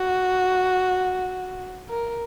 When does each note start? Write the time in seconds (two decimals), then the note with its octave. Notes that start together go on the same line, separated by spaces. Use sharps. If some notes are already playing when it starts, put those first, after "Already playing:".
Already playing: F#4
1.89 A#4